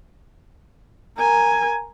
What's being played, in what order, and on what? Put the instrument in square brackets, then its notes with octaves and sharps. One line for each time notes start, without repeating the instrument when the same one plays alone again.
[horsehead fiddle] A#4 G#5